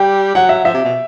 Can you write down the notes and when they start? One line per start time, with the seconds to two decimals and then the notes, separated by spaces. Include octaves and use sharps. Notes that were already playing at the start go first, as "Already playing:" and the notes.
Already playing: G3 G5
0.35 F#3 F#5
0.49 E5
0.65 F3 E5
0.74 C3
0.84 B2